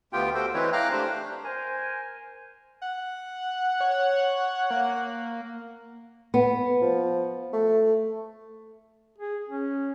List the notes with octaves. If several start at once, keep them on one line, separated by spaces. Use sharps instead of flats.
D2 B3 F4 G4 G5
F#4 G4 A4 C5 G5
E3 G#3 C4 E4 B4 C#5
F5 G5 A#5 D6 F6 F#6
A3 D4 G4 C5
A#4 C5 G#5
F#5
C#5
A#3
B3
F3
A3
G#4
C#4